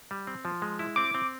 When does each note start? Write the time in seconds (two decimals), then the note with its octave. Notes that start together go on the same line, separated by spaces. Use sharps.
0.11 G3
0.27 C4
0.45 F3
0.62 G#3
0.79 E4
0.96 C4 D6
1.14 C4